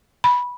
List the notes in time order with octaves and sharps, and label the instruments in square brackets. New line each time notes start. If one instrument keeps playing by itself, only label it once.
[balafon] B5